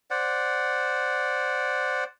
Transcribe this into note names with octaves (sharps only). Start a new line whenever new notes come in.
C5 D5 F#5